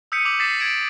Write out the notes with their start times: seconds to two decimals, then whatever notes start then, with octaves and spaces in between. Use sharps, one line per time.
0.12 D#6 E6 G6 B6 C#7 D#7
0.25 D6 F7 F#7
0.40 A6 B6 C7 E7
0.59 G#6 A6 D7 E7 F#7